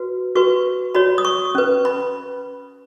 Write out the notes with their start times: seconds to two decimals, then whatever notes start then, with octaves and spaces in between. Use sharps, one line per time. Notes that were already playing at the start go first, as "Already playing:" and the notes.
Already playing: F#4 B4
0.36 F#4 B4 C#6
0.95 F#4 C#5 B5
1.18 D#6
1.25 C#6
1.55 C#4 B4
1.85 B5